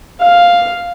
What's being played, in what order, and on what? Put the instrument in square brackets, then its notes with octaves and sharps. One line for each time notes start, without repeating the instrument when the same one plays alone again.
[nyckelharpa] F5